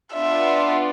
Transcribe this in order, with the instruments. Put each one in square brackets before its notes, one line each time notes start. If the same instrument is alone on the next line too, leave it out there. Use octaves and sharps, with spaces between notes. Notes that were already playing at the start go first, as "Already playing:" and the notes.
[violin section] B3 D4 F4 [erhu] E5